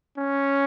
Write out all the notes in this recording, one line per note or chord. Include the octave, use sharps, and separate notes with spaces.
C#4